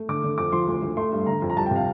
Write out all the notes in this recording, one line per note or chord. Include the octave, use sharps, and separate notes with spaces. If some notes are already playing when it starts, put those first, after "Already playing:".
Already playing: A3
D3 D6
D3
F2 D6
F3 C6
D2
D2
A3 C6
G2
D3 A#5
F2
A#5
C2 A5
G5
C3 F5